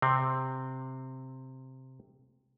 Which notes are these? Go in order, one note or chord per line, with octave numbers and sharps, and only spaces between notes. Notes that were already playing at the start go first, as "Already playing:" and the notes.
C3 C4